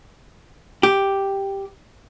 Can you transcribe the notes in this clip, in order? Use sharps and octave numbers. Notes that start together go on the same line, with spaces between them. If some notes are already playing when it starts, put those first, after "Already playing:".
G4